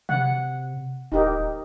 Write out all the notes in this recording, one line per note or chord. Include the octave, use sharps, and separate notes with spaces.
C3 F#5
D1 D#4 G4 A#4